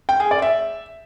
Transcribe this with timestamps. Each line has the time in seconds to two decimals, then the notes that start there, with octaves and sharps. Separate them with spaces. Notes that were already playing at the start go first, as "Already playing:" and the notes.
0.09 G5
0.20 G#4
0.31 D5
0.42 E5